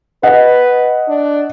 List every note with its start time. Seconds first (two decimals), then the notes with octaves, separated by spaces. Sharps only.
0.23 B4 D#5 F#5
1.08 D4